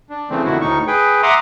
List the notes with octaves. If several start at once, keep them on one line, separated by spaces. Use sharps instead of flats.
D4
C#3 E3 A3 C4
F2 B2 D3 D#3 E4 F#4
D2 A2 D#4 C#6
G#4 B4 G5
E5 F#5 A#5 C6 D6 D#6